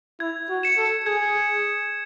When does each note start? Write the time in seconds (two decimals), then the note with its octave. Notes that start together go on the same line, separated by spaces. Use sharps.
0.20 E4 G#6
0.49 F#4
0.63 C#7 E7
0.77 A4
1.05 G#4 G#6